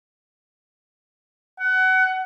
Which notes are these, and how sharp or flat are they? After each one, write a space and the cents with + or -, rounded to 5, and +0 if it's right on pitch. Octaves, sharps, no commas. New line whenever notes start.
F#5 +25